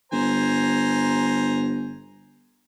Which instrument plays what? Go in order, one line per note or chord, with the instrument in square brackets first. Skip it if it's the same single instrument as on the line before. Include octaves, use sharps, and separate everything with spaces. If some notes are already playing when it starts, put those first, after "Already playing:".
[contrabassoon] G1 [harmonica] C5 G#5 A#5